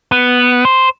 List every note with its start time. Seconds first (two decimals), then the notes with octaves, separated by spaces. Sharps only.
0.12 B3
0.65 C5